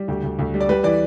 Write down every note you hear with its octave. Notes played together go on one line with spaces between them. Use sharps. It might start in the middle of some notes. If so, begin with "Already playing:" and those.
Already playing: G3
D2 G4
D2
D2
G3
D5
G3 B4
E3 D5